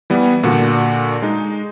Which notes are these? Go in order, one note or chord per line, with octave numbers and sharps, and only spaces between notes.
E3 G3 B3
A#2 D3 F#4
G#3 D#4